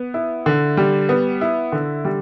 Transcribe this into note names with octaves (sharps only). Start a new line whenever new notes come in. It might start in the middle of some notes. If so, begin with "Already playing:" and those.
Already playing: B3
E4
D3
G3
B3
E4
D3
G3